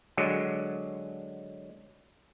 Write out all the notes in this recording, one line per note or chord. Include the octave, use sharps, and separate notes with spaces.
D3 F#3 G#3